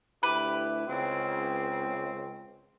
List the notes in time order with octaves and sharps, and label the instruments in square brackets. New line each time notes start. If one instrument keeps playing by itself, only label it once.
[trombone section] D2 E4 [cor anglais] G4 [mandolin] B4
[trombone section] C#2 [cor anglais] C4